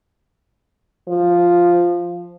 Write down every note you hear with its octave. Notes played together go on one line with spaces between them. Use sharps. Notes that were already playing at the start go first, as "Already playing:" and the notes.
F3